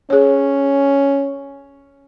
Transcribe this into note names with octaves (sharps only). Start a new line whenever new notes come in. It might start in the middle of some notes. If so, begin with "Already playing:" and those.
C#4 G#4 C#5